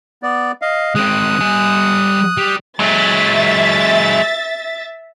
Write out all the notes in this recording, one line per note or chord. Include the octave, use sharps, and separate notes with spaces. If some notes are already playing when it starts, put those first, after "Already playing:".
B3 D5
D#5 F5
G#3 C4 D#6 F#6
G3 G#5
G3
F#3 G#3 E5 A6